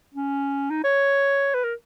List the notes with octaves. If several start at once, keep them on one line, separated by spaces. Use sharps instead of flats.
C#4
D#4
C#5
B4
A#4